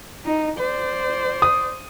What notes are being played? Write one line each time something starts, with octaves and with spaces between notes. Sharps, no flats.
D#4
C5 D5
D#6